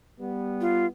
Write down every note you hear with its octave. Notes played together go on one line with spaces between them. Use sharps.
G3 B3
F4